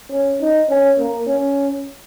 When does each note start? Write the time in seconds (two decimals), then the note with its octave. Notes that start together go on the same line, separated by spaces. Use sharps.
0.11 C#4
0.41 D#4
0.70 C#4
0.99 A#3
1.27 C#4